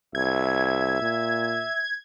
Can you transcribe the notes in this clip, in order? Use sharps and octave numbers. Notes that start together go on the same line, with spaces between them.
C2 E5 G#6
A#2